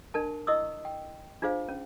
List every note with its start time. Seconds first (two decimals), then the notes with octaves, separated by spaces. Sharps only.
0.14 D4 A#4 A5
0.47 E4 D#5 C#6 D#6 E6
0.85 G5
1.42 D4 F4 G#4 C5 F5
1.69 C#4